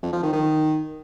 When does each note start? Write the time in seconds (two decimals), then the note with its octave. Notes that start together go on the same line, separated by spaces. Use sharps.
0.03 F2
0.13 F3
0.23 D#3
0.33 D#3